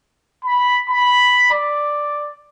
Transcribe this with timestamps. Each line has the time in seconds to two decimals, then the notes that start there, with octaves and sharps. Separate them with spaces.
0.45 B5
0.90 B5
1.52 D5